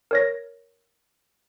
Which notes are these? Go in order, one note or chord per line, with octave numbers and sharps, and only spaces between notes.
A#4 C#5 A#6